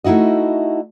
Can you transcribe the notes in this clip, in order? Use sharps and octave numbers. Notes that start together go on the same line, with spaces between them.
A3 D#4 E4 F#4 D#5